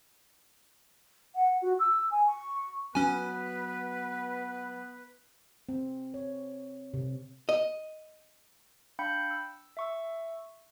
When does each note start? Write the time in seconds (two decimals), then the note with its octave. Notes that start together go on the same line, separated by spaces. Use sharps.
1.36 F#5
1.62 F#4
1.79 E6
2.11 G#5
2.27 C#6
2.95 F#3 B3 C#4 B4 G#5
5.69 C4
6.14 C#5
6.94 C3
7.49 D#5
8.99 D4 F5 G5 B5 G6 C#7
9.30 E6
9.77 E5 C#6 E6